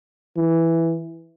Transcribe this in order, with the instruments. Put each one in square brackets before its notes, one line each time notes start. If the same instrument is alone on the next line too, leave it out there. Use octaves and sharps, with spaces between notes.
[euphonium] E3